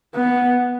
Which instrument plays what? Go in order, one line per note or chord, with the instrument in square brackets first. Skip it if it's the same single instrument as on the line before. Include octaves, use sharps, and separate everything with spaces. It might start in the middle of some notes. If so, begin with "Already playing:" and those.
[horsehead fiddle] B3